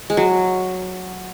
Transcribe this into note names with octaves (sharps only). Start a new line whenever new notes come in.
G#3
F#3